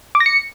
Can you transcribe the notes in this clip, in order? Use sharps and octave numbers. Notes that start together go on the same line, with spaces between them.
D6
A#6
C#7